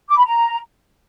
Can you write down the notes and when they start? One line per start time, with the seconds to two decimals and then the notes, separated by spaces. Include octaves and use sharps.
0.09 D6
0.17 B5
0.24 A#5